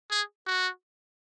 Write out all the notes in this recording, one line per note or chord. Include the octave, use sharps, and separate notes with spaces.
G#4
F#4